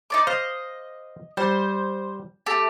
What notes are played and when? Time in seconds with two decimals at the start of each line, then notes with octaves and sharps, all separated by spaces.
0.10 D#4 D5 D6
0.27 C5 D#5 F5
1.37 G3 C5
2.46 A3 G4